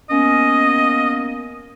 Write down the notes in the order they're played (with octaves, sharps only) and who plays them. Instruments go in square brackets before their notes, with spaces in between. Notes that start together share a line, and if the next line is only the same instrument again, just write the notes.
[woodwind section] A#3 B3 C#4 [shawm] D#5